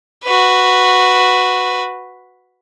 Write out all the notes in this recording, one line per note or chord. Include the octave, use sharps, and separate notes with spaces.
F#4 B4